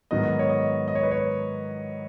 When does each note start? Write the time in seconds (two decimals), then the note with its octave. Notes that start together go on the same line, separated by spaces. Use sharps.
0.11 G#2 D#3 F#3 B3 D#5
0.39 C#5
0.50 D#5
0.88 D#5
0.95 C#5
1.03 B4
1.11 C#5